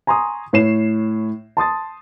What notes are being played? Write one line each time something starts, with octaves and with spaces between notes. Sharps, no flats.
G#5 A#5 C6 C#6 D#6
A2 C#5 C7 E7
A5 C6 D#6 A6